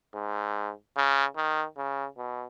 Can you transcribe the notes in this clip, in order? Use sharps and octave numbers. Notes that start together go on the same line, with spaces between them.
G#2
C#3
D#3
C#3
B2